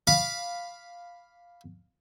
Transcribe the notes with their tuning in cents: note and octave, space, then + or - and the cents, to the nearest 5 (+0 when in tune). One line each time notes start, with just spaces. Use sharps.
F5 +0 B5 +0 D6 -10